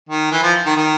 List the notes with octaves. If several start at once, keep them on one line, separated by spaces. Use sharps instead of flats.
D#3
E3
F3
D#3
D#3